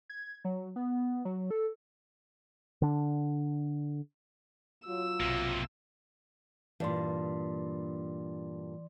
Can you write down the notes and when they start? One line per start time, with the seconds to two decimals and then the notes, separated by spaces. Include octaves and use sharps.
0.10 G#6
0.45 F#3
0.76 B3
1.25 F#3
1.51 A4
2.82 D3 D4
4.87 F#3 F4 E6
5.20 B1 C3 A#3
6.80 G2 A#2 E3 D5 C6